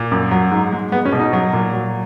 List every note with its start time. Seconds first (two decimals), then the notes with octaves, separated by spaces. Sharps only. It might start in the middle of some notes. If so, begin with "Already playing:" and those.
Already playing: A#2
0.11 F#2
0.31 F#3
0.51 G#2
0.72 G#3
0.92 G#3 B3
1.05 C#4
1.12 B2
1.20 D#4
1.33 F#3
1.53 A#2
1.73 F#3